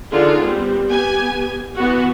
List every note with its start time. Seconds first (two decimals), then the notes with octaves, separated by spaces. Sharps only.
0.11 D3 D4 D#4 F4 G#4
0.40 G3 B3 C4
0.89 B3 G4 G#5
1.77 E3 B3 F#4